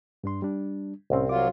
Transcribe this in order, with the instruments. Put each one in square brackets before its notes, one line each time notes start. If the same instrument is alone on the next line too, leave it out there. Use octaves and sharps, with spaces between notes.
[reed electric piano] G2 D4 C6
G3 D4
[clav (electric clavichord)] C2 C4 [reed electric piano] A2 C#4
[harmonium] F#3 F4 [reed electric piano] D6